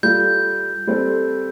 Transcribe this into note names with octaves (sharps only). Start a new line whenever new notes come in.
G3 F4 A4 G6
G3 C4 A4